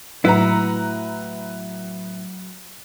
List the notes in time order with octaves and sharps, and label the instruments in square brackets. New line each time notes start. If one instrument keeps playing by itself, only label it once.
[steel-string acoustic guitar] A2 F#5 [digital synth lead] F#3 [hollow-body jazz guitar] E4 [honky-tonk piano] B4 A#5